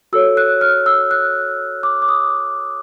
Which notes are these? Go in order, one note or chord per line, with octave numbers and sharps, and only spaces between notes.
F#4 A4 C#5 E6
F#6
F6
E6
F#6
D6
D6
D#6